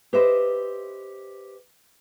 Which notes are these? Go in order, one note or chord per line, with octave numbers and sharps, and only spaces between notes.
G4 B4 C5 D#5 E5